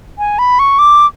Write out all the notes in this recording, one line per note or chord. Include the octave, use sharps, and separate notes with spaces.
G#5
B5
C#6
D6